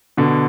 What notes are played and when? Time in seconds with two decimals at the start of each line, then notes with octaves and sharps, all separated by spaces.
0.17 B2 D3